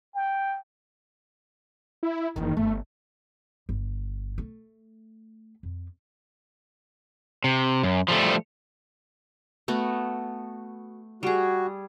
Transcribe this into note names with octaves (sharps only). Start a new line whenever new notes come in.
G5
E4
F#1 D#3 E3
G1 A3
G1
A3
F2
C3
F#2
F3 G3 A3
A3 B3 F#4
G3 F#4 G#4